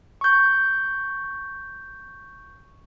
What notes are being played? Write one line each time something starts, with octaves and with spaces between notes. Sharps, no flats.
C#6 G6